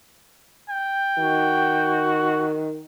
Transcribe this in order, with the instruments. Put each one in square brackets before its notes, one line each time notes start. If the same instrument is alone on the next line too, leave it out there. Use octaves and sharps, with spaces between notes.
[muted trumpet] G5
[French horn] D#3 [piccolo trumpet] F#4